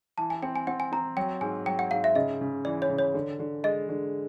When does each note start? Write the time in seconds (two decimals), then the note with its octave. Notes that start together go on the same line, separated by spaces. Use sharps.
0.18 E3 A5
0.30 G#5
0.43 C4 G5
0.56 G#5
0.67 C4 F#5
0.80 G#5
0.92 C4 A#5
1.17 F#3 G5
1.41 G#2 G#5
1.66 F#3 G5
1.79 F#5
1.91 G#2 F5
2.04 E5
2.15 C#3 D#5
2.41 C#3
2.65 E3 D5
2.82 C#5
2.90 C#3
2.98 C#5
3.14 D3
3.39 D3
3.64 G#3 D#5
3.89 D3